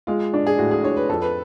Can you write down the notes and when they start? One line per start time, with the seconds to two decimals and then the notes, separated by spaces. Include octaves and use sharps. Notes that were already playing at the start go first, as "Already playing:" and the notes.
0.07 G#3 F4
0.34 D4
0.46 G#4
0.58 A2 F#4
0.71 G#4
0.83 D4 C#5
0.97 B4
1.09 F2 A4
1.22 B4